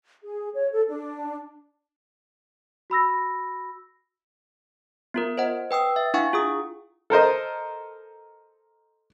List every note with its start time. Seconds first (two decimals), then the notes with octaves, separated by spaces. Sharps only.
0.24 G#4
0.54 C#5
0.72 A4
0.88 D4
2.90 F#4 B5 E6 A#6
5.14 B3 F4 A#4
5.38 C5 D#5 F#5
5.71 B4 G5 D#6 E6
5.96 E5
6.14 D4 E4 F5 F#5 G#5 C#6
6.33 F4 G#4 D#6
7.10 A4 A#4 C5 D#5